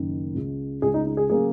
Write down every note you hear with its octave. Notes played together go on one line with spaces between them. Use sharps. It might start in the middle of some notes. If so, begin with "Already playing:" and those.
Already playing: F#1 F#2 D#3
C#2 C#3 G#3
C#2 C#3 G#3 G#4
D#4
D#4
G#4
C#3 F#3 A#3 G#4